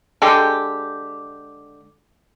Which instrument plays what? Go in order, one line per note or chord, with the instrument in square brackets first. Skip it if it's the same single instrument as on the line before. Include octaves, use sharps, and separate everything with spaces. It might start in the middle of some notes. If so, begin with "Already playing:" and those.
[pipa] D3 G#3 G4